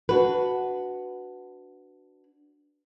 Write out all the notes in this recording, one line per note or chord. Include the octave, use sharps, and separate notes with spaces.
D4 F#4 B4